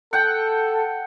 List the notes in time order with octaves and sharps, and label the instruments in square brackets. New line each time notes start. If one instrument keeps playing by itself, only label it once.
[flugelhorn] A4 [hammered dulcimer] F#5 G5